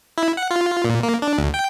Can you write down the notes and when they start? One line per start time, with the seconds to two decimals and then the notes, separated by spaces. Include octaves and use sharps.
0.18 E4
0.37 F#5
0.51 F4
0.85 A#2
1.03 A#3
1.22 D4
1.38 D2
1.54 G5